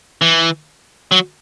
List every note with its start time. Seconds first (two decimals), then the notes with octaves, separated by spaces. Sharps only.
0.22 E3
1.12 F#3